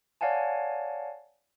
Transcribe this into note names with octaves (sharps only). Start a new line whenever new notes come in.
C#5 D5 F5 F#5 G#5 A5